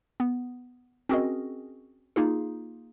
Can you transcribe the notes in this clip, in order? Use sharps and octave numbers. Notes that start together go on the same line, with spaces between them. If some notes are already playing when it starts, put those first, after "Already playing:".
B3
C4 C#4 F#4 G#4 A#4 D#5
A#3 D#4 F4 G#4